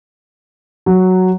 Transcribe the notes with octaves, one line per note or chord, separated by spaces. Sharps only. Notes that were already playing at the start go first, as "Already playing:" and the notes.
F#3